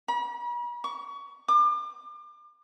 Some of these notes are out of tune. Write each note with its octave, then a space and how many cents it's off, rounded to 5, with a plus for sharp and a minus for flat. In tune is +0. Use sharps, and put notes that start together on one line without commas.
B5 -45
C#6 +25
D6 +35